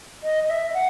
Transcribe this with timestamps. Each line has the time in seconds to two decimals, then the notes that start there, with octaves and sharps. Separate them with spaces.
0.23 D#5
0.43 D#5
0.50 E5
0.74 F#5